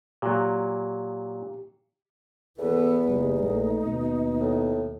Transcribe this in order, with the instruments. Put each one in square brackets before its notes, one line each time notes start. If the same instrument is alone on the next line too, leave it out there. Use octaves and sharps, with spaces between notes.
[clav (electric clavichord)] A#2 F#3 [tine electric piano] G4
[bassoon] E2 [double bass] E3 B3 [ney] A4
[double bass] F#1 [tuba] G3 [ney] D#4
[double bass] A#1 [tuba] A3
[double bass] D#2 [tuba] B2
[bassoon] A2